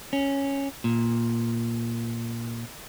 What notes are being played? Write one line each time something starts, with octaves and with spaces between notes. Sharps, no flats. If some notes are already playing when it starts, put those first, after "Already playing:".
C#4
A#2